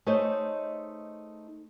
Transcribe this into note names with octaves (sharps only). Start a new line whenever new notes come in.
A3 D#4 G#4 C5 C#5 D#5